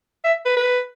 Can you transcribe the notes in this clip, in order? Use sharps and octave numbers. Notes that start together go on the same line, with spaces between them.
E5
B4
B4